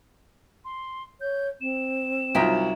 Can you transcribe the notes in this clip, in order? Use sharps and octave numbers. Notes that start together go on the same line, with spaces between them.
C6
C#5 G6
C4 E7
C2 F#3 D#4 F4 E5 G5